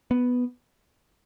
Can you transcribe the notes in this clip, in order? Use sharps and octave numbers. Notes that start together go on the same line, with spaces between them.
B3